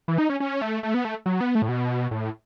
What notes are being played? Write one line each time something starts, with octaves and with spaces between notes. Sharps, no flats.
E3
D#4
C#4
C#4
A3
A3
B3
A3
F#3
B3
A3
A2
B2
A2